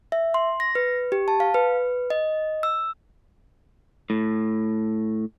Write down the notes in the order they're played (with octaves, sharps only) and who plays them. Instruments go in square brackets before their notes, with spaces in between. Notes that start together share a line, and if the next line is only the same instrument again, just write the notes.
[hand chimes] E5
C6
A#6
B4
G4
A5
F5
B4
D#5
E6
[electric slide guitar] A2